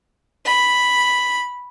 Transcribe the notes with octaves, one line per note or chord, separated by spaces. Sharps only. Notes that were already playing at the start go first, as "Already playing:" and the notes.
B5